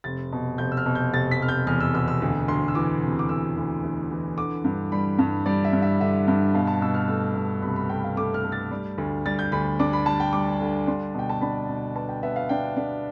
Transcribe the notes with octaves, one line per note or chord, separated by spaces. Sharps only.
F1 A6
B2
F1 G6
E6
F6
B2
G6
F1 A6
B6
F1 F6
G6
E2 F6
E6
B2 E6
E6
D2
D2 C6
E6
E3 D6
C3
D6
D2 E6
D2
D2
E3
D3 D6
G2
G3 B5
G2
G3 D5
E5
G2
E5
D3 E5
G2
B2 F5
A5
B2 E6
F6
A3 E6
B2
C2 B5
B5
A3 G5
F5
A3 D6
F6
A3
A6
G3
D2
G3 A6
G6
D2 B5
D4 D6
B5
G3 A5
G5
G3 D6
D3
D4 C6
B2 G5
A5
D4 B5
B2
B3 A5
G5
B3 E5
F5
D4 G5
D4